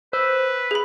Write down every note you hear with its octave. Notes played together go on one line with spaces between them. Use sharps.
B4 C5 E6
G#4 B5